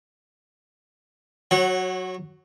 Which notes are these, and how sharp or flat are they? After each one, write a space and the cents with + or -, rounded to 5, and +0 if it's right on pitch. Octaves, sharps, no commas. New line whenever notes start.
F#3 +0 C#5 -25 F#5 +15